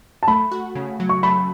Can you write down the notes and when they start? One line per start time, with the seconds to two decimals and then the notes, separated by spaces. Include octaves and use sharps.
0.23 A5
0.28 A3 B5
0.51 F#4
0.75 C#3
1.00 F#3
1.09 C#6
1.23 A3 B5